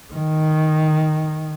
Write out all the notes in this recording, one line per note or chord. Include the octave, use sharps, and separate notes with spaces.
D#3